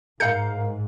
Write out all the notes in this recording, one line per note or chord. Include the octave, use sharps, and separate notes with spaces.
G#2 A#4 F5 G6 C#7